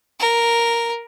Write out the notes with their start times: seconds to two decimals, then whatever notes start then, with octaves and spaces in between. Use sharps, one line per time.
0.20 A#4